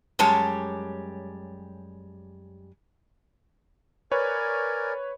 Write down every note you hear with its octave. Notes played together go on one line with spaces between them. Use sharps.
F#2 G3 G#3 G4 C#5 A5
A#4 B4 C#5 D5 G#5